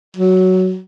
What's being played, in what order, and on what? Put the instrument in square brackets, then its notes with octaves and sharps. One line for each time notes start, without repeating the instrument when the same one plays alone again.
[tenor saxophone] F#3